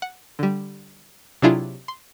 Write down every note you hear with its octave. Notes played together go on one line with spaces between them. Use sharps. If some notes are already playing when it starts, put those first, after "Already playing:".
F#5
D3 G3
C3 F#3 D4 E4 F4 G#4
C6